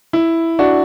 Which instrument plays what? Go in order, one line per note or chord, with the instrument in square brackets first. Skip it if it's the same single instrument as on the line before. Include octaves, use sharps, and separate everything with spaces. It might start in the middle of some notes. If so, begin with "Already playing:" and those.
[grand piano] E4
D4 F#4